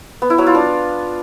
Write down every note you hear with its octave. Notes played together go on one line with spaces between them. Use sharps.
B3
E4
F#3
F4
D4